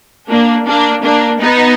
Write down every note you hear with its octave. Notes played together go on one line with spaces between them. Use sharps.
A#3 D4
A#3 D4
A#3 D4
B3 D#4